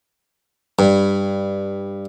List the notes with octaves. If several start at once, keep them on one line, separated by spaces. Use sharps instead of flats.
G2